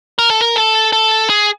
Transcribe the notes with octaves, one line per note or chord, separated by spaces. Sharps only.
A#4
A4
A#4
A4
A4
G#4